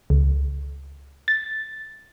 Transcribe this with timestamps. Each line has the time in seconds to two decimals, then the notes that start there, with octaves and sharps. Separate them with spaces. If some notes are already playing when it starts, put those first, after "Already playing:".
0.10 C#2
1.28 A6